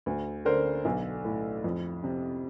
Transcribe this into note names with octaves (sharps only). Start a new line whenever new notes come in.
D2
D3 A#4 C5
B1
A2
F2
C3